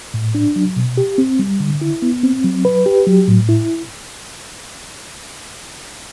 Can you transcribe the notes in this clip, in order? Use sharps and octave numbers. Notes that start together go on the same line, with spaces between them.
A2
D4
F#3
B2
G4
C4
G3
D3
E4
B3
C4
F#3
B4
G4
F#3
A2
E4